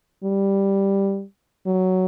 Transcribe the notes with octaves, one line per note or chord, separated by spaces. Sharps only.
G3
F#3